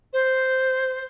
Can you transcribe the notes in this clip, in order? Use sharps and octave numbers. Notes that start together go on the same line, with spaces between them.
C5